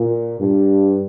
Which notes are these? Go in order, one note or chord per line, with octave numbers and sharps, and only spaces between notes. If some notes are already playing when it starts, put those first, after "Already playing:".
Already playing: A#2
G2